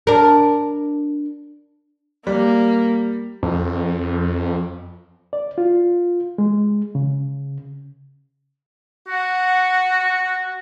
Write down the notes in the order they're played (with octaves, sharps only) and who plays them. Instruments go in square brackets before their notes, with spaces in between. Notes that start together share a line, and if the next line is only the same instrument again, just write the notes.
[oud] D4 A#4
[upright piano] G3 [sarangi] A#3
[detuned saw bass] F2
[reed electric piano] D5
F4
G#3
C#3
[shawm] F#4 [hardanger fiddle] F#5